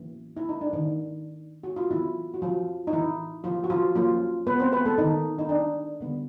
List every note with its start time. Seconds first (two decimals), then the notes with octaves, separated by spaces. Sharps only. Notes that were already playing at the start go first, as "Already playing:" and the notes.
Already playing: E3 F#3 A#3 C#4
0.37 E4
0.49 D#4
0.61 D4
0.73 D#3 D#4
1.63 F#4
1.76 F4
1.91 E3 F#3 B3 E4
2.34 F#4
2.42 F3 F4
2.87 D#4
2.93 E3 E4
3.44 F3 F4
3.64 F#4
3.70 F3 F4
3.95 F3 F#3 A#3 C#4 F4
4.47 B3 B4
4.60 C4 C5
4.73 B3 B4
4.85 A3 A4
4.98 D#3 D#4
5.39 D#4
5.49 D4
6.00 D3 G3 B3